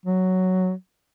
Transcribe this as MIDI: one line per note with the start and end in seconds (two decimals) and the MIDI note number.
0.05 0.72 54